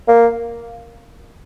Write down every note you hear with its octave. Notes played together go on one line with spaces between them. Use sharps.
A#3